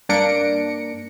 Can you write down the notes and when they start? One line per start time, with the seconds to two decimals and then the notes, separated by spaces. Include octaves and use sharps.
0.09 G2 A#3 D4 A#6 C#7 D7